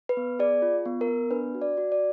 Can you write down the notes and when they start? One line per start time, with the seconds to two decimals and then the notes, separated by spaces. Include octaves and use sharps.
0.09 B4
0.17 B3
0.39 G#4 D5
0.62 F4
0.86 B3
1.01 A#4
1.08 B3
1.31 D4 B4
1.55 F#4
1.62 D5
1.77 F#4
1.92 D5